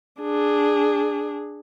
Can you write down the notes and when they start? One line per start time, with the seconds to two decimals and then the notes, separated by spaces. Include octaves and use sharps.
0.21 D4 G#4